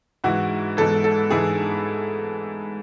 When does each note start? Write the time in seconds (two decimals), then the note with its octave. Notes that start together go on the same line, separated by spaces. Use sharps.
0.24 G#2 E3 F#4
0.77 G#2 E3 A4
1.04 A4
1.30 G#2 E3 G#4